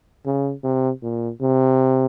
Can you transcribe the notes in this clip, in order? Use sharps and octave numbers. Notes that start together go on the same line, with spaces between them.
C#3
C3
A#2
C3